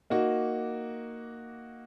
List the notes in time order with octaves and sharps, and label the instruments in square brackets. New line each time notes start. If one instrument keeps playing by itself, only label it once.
[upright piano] A#3 D#4 F#4